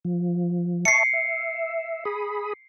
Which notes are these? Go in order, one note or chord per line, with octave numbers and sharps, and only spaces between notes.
F3
E5 A5 C#6 C7 C#7
E5
G#4 B5 D#6